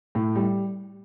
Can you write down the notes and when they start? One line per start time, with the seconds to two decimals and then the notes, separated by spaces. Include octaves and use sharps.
0.15 A2
0.35 G3